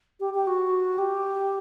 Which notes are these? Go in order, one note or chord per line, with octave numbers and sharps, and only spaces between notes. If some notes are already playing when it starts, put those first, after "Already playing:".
G4
G4
F#4
G4